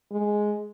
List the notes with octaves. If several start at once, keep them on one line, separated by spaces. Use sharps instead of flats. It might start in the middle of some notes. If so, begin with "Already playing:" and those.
G#3